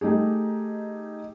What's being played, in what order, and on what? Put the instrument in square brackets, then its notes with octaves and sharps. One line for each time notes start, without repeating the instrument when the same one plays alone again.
[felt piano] A3 D#4 G4 G#4